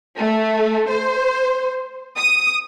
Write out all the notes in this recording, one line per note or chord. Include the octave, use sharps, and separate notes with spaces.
A3
C5
D#6